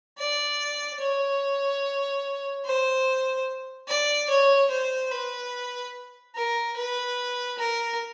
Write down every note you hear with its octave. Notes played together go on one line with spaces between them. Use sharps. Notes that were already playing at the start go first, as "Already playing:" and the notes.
D5
C#5
C5
D5
C#5
C5
B4
A#4
B4
A#4